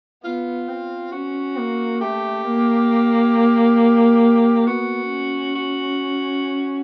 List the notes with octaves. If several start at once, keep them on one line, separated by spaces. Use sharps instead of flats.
B3 F4
C4
C#4 F#4
A#3
A3 G4
A#3
B3 F#4
C#4
F#4